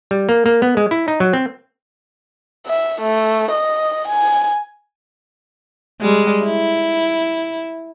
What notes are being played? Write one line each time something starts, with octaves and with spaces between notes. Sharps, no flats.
G3
A#3
A#3
B3
G#3
E4
D#4
F#3
C4
E5
A3
D#5
G#5
G3 G#3
E4